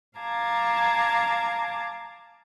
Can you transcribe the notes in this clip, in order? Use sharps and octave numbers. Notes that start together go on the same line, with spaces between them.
F5 A5 A#5 D6 G#6